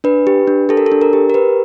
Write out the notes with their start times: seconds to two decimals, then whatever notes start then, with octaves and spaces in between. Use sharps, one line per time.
0.04 D4 B4
0.27 G4
0.47 D4
0.69 G4 A4
0.77 A#4
0.86 A4
0.92 D4
1.01 A#4
1.13 G4
1.30 A#4
1.34 G4 B4